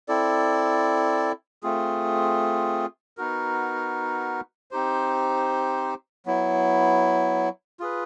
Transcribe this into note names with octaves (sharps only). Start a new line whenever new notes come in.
C4 E4 A4 D5
A3 C4 F4 G#4
B3 D#4 F#4 A#4
C4 D#4 G4 C5
F#3 B3 E4
F4 G#4 B4